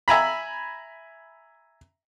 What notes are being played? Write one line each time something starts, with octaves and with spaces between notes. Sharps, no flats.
E5 G#5 A#5 B5